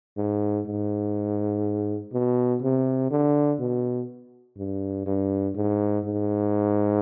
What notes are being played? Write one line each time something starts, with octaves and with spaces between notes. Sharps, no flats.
G#2
G#2
B2
C3
D3
B2
G2
G2
G#2
G#2